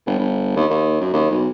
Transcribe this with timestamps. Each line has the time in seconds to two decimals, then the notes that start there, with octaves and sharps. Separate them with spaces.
0.06 G1
0.19 G1
0.56 D#2
0.70 D#2
1.00 F#2
1.13 D#2
1.31 B1